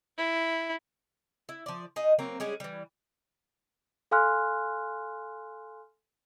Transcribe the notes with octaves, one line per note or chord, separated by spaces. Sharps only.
E4
E4
F3 D5
D#4 G#4 D#5
F#3 A#3 C4
G3 G#3 C#4 G#4
E3 G3
A4 F5 G#5 C6 F6 F#6